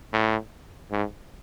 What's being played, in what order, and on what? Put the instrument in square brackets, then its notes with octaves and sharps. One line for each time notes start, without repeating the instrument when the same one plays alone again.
[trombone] A2
G#2